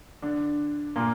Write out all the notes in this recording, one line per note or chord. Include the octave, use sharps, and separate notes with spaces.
D3 D4
A#2 A#3